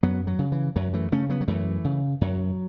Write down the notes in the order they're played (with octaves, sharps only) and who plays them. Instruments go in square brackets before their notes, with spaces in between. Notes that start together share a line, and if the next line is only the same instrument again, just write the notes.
[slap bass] F#2 F#3 B3
F#3
C#3
E3
F#2 F#3
E3 A3
C#3 A3 C#4
F#3 B3
F#3
F#2 E3 A3
C#3
F#2 F#3